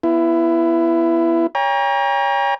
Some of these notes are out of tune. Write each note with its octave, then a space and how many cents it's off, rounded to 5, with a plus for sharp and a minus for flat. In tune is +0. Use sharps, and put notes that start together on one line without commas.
B3 +0 E4 +20
C#5 +25 G5 +45 A#5 +25